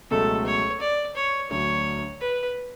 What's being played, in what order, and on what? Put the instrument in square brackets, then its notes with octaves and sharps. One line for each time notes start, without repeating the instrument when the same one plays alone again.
[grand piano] C#2 B2 F#3 A3 [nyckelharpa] A4
[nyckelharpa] C#5
D5
C#5
[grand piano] D2 D3 F#3 [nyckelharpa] C#5
[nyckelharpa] B4